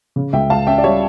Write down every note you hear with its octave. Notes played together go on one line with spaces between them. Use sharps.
C#3
C#2 E5 G5
C#2 F5 A5
C#4 E5 G5
D5
G3 C#5 E5